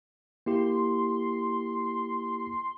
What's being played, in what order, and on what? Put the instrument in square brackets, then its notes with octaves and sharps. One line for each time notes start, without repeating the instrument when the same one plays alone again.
[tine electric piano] A#3 E4 G4 [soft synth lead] C6